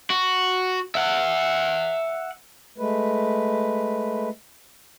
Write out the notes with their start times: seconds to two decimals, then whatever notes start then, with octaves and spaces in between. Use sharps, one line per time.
0.10 F#4
0.95 E5 F#5
2.78 G#3 A3 B4